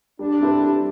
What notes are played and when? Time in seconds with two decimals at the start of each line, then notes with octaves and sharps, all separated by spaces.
0.19 G3 D4
0.41 C4 E4 G4 B4
0.61 G3